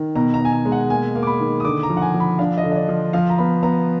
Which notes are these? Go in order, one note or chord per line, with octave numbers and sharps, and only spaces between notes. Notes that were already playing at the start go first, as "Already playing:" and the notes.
Already playing: D#3
B2 A#5
A#5
B2 G#5
A#5
G#3
F#5
A#3 G#5
A#3
D6
B5
D#3
D#6
D3 D6
A#5
F3
F#5
G#5
F3
B5
D4 F5
D#5
D3
D#5
D5
F3
F3 F5
A#5
B3 B5
B3 A#5